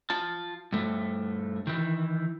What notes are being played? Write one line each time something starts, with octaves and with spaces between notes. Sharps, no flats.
F4 A5
G2 A3
D#3 E3